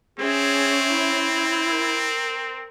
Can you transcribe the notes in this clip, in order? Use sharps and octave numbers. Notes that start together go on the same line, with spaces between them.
C4 C#4 G#4 C#5 E5
E4
A#4